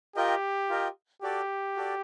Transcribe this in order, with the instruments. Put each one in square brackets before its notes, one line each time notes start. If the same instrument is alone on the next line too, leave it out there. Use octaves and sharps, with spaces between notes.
[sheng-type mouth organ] F4 A#4 D#5 G5 [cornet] G4
[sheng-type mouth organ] F4 A#4 D#5 G5
[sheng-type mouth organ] F#4 A4 D5 [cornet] G4
[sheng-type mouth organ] F#4 A4 D5